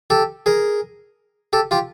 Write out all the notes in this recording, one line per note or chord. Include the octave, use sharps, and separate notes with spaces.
G4 A4
G#4 A#4
G4 A4
F4 G4